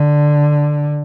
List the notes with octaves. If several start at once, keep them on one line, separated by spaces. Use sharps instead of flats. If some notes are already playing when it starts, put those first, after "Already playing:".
Already playing: D3